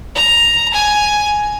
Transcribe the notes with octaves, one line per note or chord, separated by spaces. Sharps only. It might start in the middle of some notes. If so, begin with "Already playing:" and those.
A#5
G#5